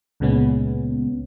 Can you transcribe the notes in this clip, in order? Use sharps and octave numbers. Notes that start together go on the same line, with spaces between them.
C#2 A#2 C#3 G#3 B3 C#4